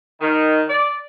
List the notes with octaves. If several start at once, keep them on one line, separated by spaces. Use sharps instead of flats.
D#3
D5